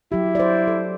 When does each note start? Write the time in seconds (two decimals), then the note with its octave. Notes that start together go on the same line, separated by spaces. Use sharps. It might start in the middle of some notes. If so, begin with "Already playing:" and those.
0.12 F#3 E4 G4
0.35 C5 D5
0.68 A4